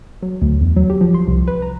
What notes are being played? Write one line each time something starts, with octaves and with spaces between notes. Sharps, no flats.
F#3
D2
E2
F#3
G4
F3
C6
C2
B4
A#5